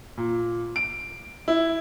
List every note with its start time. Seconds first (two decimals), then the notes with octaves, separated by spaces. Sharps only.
0.18 A#2
0.76 D7
1.48 E4